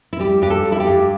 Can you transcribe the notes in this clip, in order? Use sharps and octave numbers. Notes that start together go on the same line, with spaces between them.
E4
G3 G4
G2 G4
A4
G3
E4
G4
G2